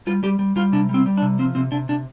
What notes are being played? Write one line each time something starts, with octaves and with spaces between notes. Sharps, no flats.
G3 F4
G3 G4
G3
G3 F4
C3 D4
G3
C4
G3
D4
C3
F3 C4
C3 C4
C3 D4
C3 D4